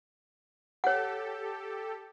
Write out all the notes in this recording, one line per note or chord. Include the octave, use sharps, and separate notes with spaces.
G4 A4 C#5 F#5